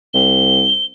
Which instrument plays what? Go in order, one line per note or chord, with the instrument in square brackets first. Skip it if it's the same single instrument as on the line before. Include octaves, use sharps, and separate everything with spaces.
[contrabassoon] C2 [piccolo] G7